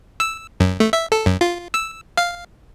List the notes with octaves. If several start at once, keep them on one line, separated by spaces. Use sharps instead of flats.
E6
F#2
A3
E5
A4
F#2
F4
E6
F5